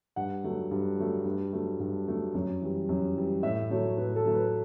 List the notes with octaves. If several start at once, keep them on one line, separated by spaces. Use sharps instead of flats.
G2 F#5
F#3 A3
G2
F#3 A3
G2
F#3 A3
G2
F#3 A3
F#2
E3 G3
F#2
E3 G3
A2 E5
F#3 A3 C#5
A2 B4
A4
F#3 A3
B4